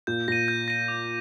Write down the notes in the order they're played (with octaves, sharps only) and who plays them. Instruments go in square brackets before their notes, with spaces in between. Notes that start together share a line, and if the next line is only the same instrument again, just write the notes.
[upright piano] A#2 [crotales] G6
[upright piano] A#2 [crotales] A#6 D#7
[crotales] G6
A#6 D#7
D6